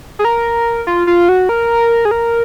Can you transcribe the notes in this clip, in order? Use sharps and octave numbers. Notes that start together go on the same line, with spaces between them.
G#4
A#4
F4
F4
F#4
A#4
G#4
A#4